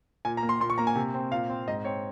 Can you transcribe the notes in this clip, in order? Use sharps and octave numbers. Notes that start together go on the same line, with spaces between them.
A#2 G#5
A#5
A#3
C6
A#2 C6
C#6
A#3 A#5
G#5
C3
C4
A#2 F5
C4
G#2 D#5
C4 C#5